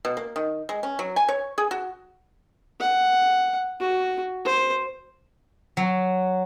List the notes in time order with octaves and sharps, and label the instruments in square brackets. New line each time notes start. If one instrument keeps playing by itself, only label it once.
[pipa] B2
A#3
D#3
G#3
C#4
F#3
G#5
C#5
G#4
F#4
[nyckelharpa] F#5
F#4
C5
[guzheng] F#3